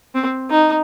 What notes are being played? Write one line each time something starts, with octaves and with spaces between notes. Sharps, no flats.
C4
D#4